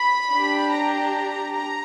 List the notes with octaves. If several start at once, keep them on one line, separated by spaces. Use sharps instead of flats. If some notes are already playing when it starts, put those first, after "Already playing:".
Already playing: B5
D4 G4
A#5
A#5